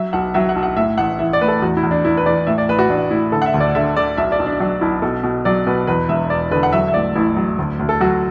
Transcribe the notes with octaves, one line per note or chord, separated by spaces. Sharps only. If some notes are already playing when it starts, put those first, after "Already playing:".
Already playing: F#3 E5
B1 F#5
F#3 E5
F#5
B1
F#5
A2 E5
A1 F#5
E3 E5
D5
A2 B4
A4
E2 F#4
E4
E2
D4
E3 E4
B4
E3 D5
A2 E5
D5
A1 B4
F#4
A1 D4
A2 E4
D3 A4
F#5
E5
D2
D5
D3 E5
D3 D5
B1 E5
D5
B1
D4
F#3 D4
B1 E4
B2 A4
B2
F#3 D5
B2 B4
E2 B4
E1 E5
E1 D5
D3 B4
F#5
F#3 E5
E5
A1 D5
A1 E4
F#3
D2
D2
A4
F#3 F#4